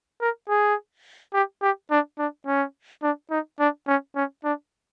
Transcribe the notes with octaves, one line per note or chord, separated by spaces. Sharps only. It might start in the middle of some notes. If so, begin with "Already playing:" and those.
A#4
G#4
G4
G4
D4
D4
C#4
D4
D#4
D4
C#4
C#4
D4